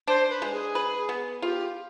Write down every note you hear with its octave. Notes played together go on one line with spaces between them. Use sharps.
D4 C5
B4
G#3
G#4
B4
B3
F4 G4 G#4